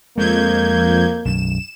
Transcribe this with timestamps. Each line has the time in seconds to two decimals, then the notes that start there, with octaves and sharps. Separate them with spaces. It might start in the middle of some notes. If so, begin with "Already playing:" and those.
0.18 F2 G#3 A#3 G6 G#6
1.25 B1 F#2 E7